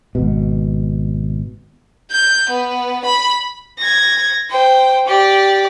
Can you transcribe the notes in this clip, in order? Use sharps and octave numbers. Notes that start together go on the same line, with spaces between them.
G#1 B2
G6
B3
B5
G#6 A#6
C5 G5
G4 D5